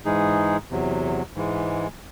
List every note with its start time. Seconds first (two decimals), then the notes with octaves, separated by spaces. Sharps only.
0.05 G#2 E3 G#3 D#4 G#4
0.70 E2 C3 F#3
1.35 G#2 E3 G#3